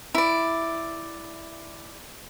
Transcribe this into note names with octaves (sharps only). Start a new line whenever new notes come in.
E4 D5